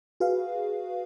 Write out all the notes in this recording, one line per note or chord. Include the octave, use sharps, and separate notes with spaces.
F#4 G#4 B4 F5